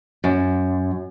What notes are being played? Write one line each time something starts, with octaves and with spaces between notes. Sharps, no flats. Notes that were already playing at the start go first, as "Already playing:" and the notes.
F#2